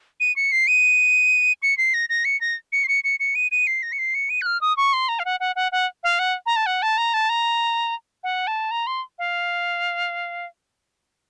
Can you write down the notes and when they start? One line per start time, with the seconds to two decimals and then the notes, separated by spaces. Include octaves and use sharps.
0.20 D#7
0.36 C#7
0.52 C7
0.68 D#7
1.63 C#7
1.78 C7
1.94 A#6
2.10 A#6
2.25 C#7
2.41 A#6
2.72 C#7
2.84 C7
2.88 C#7
3.04 C#7
3.20 C#7
3.35 D#7
3.51 D#7
3.67 C7
3.83 A#6
3.92 C#7
3.99 C7
4.15 C#7
4.30 D#7
4.41 F#6
4.46 F6
4.61 D#6
4.77 C#6
4.93 C6
5.09 A#5
5.19 F5
5.25 F#5
5.40 F#5
5.56 F#5
5.72 F#5
6.03 F5
6.19 F#5
6.46 A#5
6.56 A5
6.66 F#5
6.82 A5
6.98 A#5
7.14 A5
7.29 A#5
8.24 F#5
8.47 A5
8.71 A#5
8.87 C6
9.19 F5